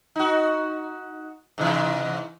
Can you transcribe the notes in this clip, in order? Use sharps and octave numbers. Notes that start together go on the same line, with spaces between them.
D#4 F#4
G#2 C3 E3